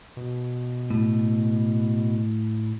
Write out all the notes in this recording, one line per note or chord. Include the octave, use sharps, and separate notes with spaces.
B2
A2